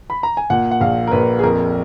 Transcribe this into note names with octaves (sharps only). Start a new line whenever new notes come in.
B5
A#5
G#5
A#2 F#5
F#5
A#1 F5
A#4
A#1 B4
G#4
F2 A#4